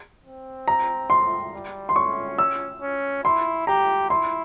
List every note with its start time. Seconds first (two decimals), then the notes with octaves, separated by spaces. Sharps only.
0.25 C4
0.68 A#5
1.10 C6
1.53 G3
1.89 C6
1.96 C#4 C#6
2.39 E6
2.82 C#4
3.24 E4 C6
3.67 G4 A#5
4.10 E4 C6